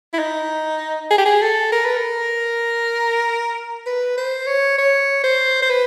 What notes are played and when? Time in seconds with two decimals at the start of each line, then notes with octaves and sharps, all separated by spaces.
0.13 E4
0.19 D#4
1.11 G#4
1.18 G4
1.26 G#4
1.42 A4
1.72 A#4
1.85 B4
1.97 A#4
3.86 B4
4.18 C5
4.47 C#5
4.78 C#5
5.24 C5
5.62 C5
5.70 B4